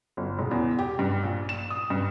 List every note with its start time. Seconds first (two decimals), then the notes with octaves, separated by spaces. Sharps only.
0.17 G1
0.39 E1
0.51 E2
0.78 G4
0.99 G2
1.23 A#1
1.49 E7
1.70 D#6
1.90 G2